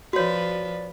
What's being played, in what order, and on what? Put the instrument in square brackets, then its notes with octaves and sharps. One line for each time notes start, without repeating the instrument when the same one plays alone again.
[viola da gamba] F3 B4 [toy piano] F#4 C#5 [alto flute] D5